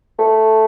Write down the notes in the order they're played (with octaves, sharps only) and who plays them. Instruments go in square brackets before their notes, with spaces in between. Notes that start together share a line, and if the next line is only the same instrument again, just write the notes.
[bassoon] A3